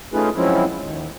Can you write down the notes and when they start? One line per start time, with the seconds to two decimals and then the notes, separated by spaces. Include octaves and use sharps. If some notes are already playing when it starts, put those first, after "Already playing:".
0.13 A3 C#4 D#4 F4 G#4 B4
0.36 F3 F#3 G#3 C4 C#4 E4
0.79 D#2